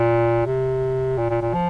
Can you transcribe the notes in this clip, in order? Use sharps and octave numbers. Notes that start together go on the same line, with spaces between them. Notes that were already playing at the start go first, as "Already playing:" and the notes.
Already playing: A#2
C3
A#2
A#2
A#2
F3